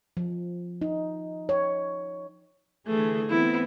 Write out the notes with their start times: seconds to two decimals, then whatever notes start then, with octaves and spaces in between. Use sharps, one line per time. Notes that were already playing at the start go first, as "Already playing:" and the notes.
0.17 F3
0.82 D#4
1.49 C#5
2.86 D3 E3 A3 G#4
3.29 E3 B3 C4 E4